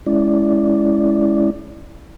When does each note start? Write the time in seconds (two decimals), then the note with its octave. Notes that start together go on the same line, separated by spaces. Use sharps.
0.06 G#3 C#4 E4 D5